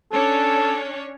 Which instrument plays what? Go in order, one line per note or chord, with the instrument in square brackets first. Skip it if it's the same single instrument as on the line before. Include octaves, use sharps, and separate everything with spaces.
[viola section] C#4 D4 C#5 [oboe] A4